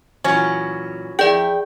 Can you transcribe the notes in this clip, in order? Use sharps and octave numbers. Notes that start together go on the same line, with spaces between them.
A#2 E3 F#3 C#4
F2 E4 G#4 D5 G5